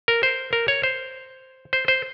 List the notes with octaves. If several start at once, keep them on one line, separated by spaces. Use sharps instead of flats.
A#4
C5
A#4
C#5
C5
C5
C5